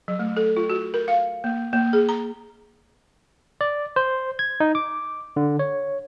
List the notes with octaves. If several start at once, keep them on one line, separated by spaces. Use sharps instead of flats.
F#3
A3
A4
F4
F#4
A#4
F5
A#3
A#3
G#4
A#5
D5
C5
G#6
D#4
D6
D3
C#5